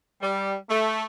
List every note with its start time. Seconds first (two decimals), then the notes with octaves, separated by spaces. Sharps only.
0.22 G3
0.70 A3